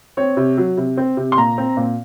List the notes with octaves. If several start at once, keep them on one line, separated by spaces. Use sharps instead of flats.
C4 C#5
C3
F#3
C3
C4
C3
C6
A#2 A#5
C4
A#2